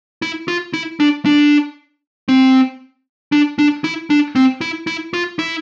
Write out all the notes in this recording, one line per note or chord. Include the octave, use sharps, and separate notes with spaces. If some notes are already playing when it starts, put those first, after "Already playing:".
E4
F4
E4
D4
D4
C4
D4
D4
E4
D4
C4
E4
E4
F4
E4